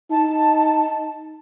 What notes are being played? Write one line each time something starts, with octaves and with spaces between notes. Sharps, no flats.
D#4 A5